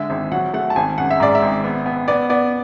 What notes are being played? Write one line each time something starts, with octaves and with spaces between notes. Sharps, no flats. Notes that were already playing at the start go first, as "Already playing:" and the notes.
Already playing: D3 G#3 E5
G#1
F#3 F#5
A3 F#5
A5
G#1 G#5
F#2 F#5
E5
G#2 D5
E5
G#1
B3
B3
B3 D5
B3 D5